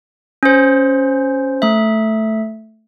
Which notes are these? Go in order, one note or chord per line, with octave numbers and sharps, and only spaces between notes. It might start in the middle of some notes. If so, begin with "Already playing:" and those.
C#4 C5
A3 E5